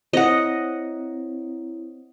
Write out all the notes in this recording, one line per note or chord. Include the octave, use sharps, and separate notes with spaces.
C4 E4 C#5 D#5 F#5